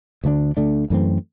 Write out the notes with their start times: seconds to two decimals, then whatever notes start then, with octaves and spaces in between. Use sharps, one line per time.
0.24 D2 D3 A3 D4
0.57 D2 D3 A3 D4
0.90 F#2 E3 A3 C4